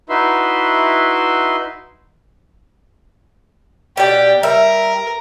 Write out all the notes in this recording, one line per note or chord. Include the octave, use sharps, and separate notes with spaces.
D#4 E4 F#4 B4 E5 C6
B2 G4 D5
G3 A#4 E5